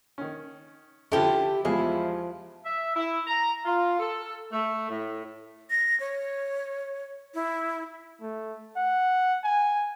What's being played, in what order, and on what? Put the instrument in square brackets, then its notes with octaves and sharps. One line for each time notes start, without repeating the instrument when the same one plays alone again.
[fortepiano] D#3 C#4
[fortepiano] D3 F3 C#4 [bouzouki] E4 G4 [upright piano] A4 G5 A5
[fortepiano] E2 F4 G#4 [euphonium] F3 [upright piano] G#3 G4 [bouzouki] E4
[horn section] E5
E4
A#5
F4
A4
A3
A2
[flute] A#6
C#5
E4
[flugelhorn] A3
F#5
G#5